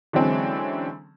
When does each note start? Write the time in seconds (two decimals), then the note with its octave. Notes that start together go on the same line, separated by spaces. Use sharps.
0.13 D3 E3 F#3 G#3 C4 C#4